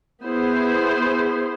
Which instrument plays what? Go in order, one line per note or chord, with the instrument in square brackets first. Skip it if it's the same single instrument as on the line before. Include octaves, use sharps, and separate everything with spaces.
[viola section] B3 E4 G#4 C5